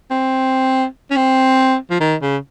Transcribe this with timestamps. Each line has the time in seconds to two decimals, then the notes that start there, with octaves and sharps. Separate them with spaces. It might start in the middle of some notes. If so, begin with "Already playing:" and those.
0.11 C4
1.10 C#4
1.16 C4
1.90 F3
2.00 D#3
2.22 C#3